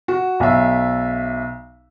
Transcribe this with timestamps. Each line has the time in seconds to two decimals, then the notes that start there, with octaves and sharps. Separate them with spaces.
0.08 F#4
0.40 B1 E5